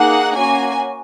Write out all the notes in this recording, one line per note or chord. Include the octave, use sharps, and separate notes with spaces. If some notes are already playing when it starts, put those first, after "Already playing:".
Already playing: A#3 D#4 G#4 F#5
A#3 C#4 F#4 G#5